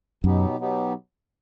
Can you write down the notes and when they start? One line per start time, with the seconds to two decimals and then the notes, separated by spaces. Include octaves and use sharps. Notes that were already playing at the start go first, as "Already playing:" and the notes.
0.24 F#2 B2 F#3 B3 D#4 G4
0.59 B2 F#3 B3 D#4 G4